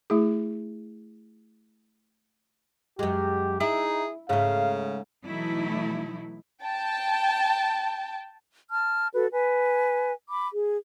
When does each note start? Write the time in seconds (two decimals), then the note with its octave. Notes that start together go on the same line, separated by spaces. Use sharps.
0.10 A3 E4 G#4
2.99 F#2 G#3 G4
3.60 D#4 E4 G#4
4.29 G#2 C#3 A3 F5
5.26 B2 E3 F#3 A3 D#4 E4
6.64 G5 A5
8.69 A5 F6
9.13 F#4 A4 B4
9.33 B4 G#5
10.28 B5 D6
10.52 G#4